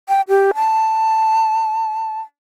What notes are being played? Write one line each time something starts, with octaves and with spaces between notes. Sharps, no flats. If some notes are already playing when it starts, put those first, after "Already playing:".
G5
G4
A5